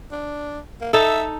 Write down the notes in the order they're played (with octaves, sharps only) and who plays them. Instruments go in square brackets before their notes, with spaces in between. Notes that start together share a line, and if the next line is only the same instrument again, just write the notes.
[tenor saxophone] D4
A#3
[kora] D#4 A4 [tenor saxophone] E5